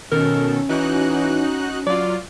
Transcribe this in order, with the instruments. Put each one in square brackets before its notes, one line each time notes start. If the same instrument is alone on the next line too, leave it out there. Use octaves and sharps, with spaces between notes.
[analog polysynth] B2 D#3 A4 [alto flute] C#4 [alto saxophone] A#4
[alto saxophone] E3 [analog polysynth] D#4 F#4 F#6
[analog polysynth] F#3 F4 [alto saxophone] D5